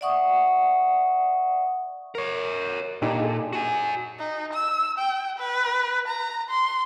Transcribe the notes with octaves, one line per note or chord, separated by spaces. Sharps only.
D5 E5 F#5 C#6 D#6
A#4 C#5
A#2 D4 D#4 G4
G#4 A4
F#4 G#5
D#4
E6
G5
B4
A#5
C6